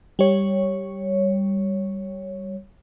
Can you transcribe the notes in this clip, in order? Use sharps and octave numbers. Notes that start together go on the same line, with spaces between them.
G3 C#5